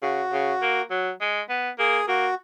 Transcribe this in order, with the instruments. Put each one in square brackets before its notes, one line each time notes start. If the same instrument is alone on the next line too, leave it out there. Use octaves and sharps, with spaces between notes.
[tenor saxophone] C#3 [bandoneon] F#4
[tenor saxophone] C#3
A#3
F#3
G#3
B3
[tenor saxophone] A#3 [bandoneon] G#4
[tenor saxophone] A#3 [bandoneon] F#4